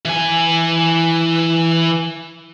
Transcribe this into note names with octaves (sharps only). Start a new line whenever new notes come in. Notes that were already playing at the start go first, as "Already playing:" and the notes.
E3 G#5